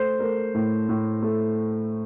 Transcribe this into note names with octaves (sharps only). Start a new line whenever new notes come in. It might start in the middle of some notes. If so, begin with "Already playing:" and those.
Already playing: A3 C5
A3 A#4
A2
A2
A3